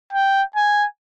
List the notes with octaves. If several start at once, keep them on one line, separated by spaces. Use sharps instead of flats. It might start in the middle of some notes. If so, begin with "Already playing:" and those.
G5
G#5